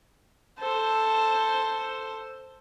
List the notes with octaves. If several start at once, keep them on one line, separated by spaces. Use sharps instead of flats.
A4 C5